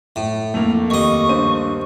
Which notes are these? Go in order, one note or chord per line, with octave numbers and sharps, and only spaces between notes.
A2
F1 A3 A#3 F7
D#2 D#5 C#6
G2 C5 D#7